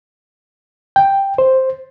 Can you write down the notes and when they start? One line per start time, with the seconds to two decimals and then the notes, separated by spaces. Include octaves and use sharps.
0.96 G5
1.38 C5